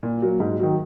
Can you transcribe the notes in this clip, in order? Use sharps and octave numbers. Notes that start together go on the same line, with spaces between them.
A#2
F#3 A#3
G#2
D#3 F#3